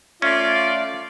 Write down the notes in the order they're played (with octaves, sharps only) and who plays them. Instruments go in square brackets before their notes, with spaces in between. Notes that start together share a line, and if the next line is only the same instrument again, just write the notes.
[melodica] A3 [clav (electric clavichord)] C#4 [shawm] F4 [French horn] D5